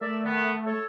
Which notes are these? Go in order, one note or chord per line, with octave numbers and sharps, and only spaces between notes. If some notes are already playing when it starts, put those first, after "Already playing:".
A3 A#4 D5 E5
D#3 B3
A4 C#5